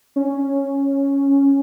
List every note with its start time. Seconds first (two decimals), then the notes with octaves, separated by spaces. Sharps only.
0.16 C#4